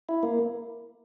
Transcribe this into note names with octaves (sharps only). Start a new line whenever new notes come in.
E4
A#3